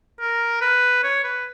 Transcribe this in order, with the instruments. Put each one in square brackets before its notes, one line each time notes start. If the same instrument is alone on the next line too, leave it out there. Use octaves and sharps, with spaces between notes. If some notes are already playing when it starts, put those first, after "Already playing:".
[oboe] A#4
B4
C#5
B4